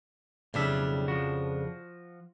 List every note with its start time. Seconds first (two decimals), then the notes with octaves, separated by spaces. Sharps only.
0.54 B1 F2 C#3 G3 D4 E5
1.08 F3 F#4